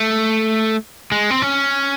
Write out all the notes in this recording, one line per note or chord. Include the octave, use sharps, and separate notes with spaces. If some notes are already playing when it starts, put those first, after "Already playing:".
Already playing: A3
G#3
C4
C#4